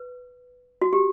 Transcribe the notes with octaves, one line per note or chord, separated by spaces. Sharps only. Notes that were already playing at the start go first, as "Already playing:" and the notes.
Already playing: B4
F#4
G4